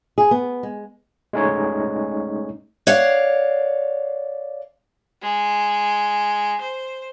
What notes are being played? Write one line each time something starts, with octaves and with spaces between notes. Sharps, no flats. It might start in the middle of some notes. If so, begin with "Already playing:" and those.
G#4
B3
G#3
G#3 A3 C#4 D#4 C#5
C#5 D5 F5 F#5
G#3
C5